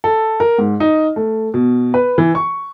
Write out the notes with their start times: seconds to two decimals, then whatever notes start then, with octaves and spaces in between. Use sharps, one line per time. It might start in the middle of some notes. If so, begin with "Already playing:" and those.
0.04 A4
0.40 A#4
0.58 G#2
0.80 D#4
1.16 A3
1.54 B2
1.94 B4
2.18 E3
2.35 C#6